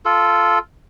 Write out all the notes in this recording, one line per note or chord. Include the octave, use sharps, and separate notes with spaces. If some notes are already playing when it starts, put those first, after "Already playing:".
F4 A4